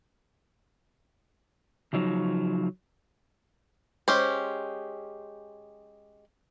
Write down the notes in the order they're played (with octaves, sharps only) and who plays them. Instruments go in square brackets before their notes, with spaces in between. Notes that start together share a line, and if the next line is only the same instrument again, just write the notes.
[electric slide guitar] C#3 F3 F#3 D#4
[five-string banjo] G#3 C#4 G4 C5